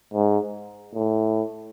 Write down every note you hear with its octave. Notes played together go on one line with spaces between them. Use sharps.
G#2
A2